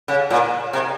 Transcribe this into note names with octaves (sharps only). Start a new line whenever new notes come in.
C#3
A#2
C3